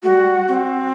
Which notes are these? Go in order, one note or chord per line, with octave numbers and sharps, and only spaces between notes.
G3 A3 F#4
C4